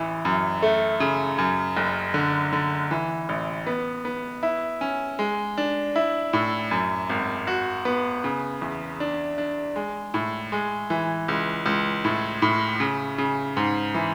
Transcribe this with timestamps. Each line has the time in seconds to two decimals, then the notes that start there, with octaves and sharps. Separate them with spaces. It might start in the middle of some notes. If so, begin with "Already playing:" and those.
Already playing: A1 E3
0.25 F#2
0.62 A3
1.00 C#3
1.38 F#2
1.77 F#1
2.14 D3
2.52 D3
2.91 E3
3.29 A1
3.67 B3
4.05 B3
4.43 E4
4.81 C#4
5.19 G#3
5.58 D4
5.96 E4
6.33 A2
6.71 F#2
7.10 G#1
7.47 F#4
7.85 B3
8.24 C#3
8.62 E2
9.00 D4
9.38 D4
9.76 G#3
10.14 A2
10.52 G#3
10.90 E3
11.28 C#2
11.66 C#2
12.05 A2
12.42 A2
12.80 C#3
13.18 C#3
13.57 G#2
13.94 E3